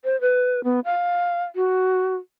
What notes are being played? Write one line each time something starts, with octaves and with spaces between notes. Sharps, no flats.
C5
B4
B3
F5
F#4